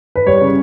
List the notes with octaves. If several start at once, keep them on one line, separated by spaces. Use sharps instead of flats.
B4
G3 C#5
C#3